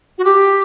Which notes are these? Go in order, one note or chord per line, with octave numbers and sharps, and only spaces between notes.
F#4
G4